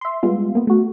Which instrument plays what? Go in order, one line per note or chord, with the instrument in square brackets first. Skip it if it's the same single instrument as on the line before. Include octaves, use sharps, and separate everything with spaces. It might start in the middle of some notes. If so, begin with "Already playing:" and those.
[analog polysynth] E5 C6
G3 G#3 B3 F4
A#3 B3
A3 F#4